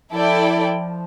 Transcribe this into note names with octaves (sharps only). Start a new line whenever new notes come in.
F3 E4 A4 D5 G5